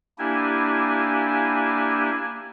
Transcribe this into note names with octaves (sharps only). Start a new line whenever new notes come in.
A#3 D4 E4 G4 G#5